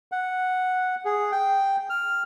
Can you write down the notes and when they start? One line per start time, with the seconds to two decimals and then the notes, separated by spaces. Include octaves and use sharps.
0.12 F#5
1.05 G#4
1.32 G5
1.90 F6